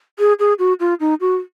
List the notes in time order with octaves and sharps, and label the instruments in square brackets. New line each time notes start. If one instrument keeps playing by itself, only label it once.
[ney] G#4
G#4
F#4
F4
D#4
F#4